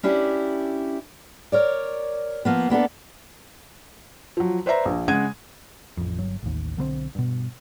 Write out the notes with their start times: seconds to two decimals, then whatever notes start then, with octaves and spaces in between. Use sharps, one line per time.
0.03 C#4 D4 E4 G4
1.52 A#4 C#5 D5
2.45 F3 A#3 B3
2.70 A#3 B3 D4 A4
4.37 F3 F#3
4.66 B4 C5 D5 E5 A#5
4.85 A#1
5.08 C#3 G#3 F#5 G#6 D#7
5.97 A1 F2
6.18 G1 F#3
6.43 A1 D#2
6.77 B1 D3 G3 C4
7.15 G2 B2